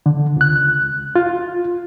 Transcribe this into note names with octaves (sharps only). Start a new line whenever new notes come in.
D3
C#2 F#6
F4